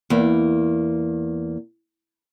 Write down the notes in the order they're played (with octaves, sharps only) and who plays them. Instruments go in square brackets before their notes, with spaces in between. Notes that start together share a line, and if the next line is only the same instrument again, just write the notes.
[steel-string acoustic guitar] E2 A#3